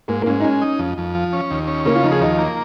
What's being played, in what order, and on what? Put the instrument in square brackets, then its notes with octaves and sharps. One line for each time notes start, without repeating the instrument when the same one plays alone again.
[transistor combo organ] G#2 [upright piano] A#3
[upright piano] A#3
[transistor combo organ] G#2 [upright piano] C#4
[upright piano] D#4
[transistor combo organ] G#3 [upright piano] C#4
[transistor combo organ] D#4
F2
F2
F3
C#4
D#2
C#4
[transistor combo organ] C#3 [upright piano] A#3
[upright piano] F4
[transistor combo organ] F3 [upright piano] D#4
[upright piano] G#4
[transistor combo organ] D#2 [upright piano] D#4
[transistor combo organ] A#3